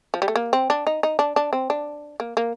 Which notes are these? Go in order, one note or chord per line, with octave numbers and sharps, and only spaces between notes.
F3
G3
A3
A#3
C4
D4
D#4
D#4
D4
D4
C4
D4
A#3
A#3